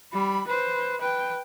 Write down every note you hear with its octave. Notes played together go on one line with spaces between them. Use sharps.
G3 B5
B4 C5
B4 G5